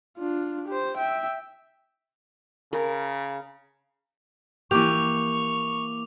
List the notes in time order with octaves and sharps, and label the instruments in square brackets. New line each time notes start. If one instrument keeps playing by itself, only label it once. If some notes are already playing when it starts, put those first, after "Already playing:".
[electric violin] D4 F4
G4 C5
E5 G5
[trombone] C#3 [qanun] A#4
[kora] E3 G4 [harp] A#3 [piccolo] C#6 [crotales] D6 F7